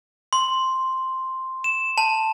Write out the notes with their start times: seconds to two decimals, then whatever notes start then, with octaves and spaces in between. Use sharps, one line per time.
0.33 C6
1.64 E7
1.98 A5